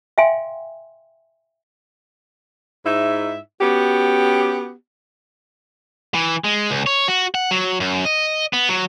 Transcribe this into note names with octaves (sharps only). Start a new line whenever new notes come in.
E5 F5 G5 G#5 C6
G#2 D#4 E4 E5
B3 C#4 F#4 G4
E3
G#3
C#2
C#5
F#4
F#5
F#3
F#2
D#5
B3
F#3